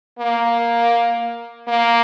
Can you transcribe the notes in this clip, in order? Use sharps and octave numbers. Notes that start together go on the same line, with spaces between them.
A#3
A#3